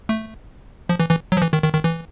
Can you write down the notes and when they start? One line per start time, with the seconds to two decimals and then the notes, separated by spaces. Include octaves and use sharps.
0.09 A3
0.89 F3
1.00 E3
1.10 E3
1.32 F#3
1.37 F3
1.42 E3
1.53 D#3
1.64 D#3
1.74 D#3
1.84 E3